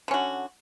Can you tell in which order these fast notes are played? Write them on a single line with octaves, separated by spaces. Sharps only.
D3 C#4 F#4